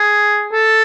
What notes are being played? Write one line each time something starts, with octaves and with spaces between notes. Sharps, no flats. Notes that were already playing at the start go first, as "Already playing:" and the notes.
Already playing: G#4
A4